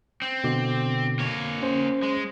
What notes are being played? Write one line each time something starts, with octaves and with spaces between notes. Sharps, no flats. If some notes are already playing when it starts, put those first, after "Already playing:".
C4
B2 D3 D6
A#3 C#5
C#4 C5
G#3